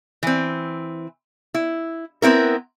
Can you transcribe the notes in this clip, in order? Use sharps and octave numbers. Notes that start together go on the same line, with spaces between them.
E3 C4
E4
B3 C4 E4 A#4